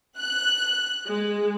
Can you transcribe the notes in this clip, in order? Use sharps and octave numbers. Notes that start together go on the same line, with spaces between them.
F#6
G#3